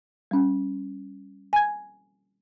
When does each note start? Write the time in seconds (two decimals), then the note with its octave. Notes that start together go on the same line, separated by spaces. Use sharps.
0.31 G3 C#4
1.53 G#5 G#6